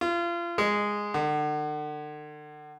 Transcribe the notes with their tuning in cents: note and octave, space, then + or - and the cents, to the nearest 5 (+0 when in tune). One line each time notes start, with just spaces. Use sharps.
F4 -30
G#3 -5
D3 +40